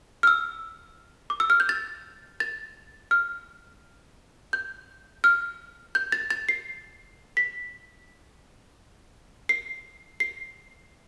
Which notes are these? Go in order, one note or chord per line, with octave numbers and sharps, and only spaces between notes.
F6
E6
D6
E6
F6
G6
A6
A6
F6
G6
F6
G6
A6
A6
C7
B6
C7
C7